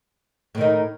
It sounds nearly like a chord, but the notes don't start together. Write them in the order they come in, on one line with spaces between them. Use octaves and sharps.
A2 D#3 D#4